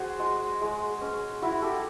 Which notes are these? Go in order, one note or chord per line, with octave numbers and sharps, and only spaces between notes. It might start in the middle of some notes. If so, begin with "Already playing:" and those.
Already playing: F#4 G#4 C5 D5
G#3
G#3
C#4
E4 F#4
G4 A4